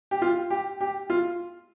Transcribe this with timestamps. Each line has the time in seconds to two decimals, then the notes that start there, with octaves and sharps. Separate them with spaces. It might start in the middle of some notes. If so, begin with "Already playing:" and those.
0.11 G4
0.22 F4
0.50 G4
0.81 G4
1.10 F4